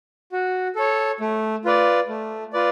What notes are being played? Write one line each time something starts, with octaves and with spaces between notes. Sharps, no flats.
F#4
A4 C#5
A3
F4 B4 D5
A3
F4 B4 D5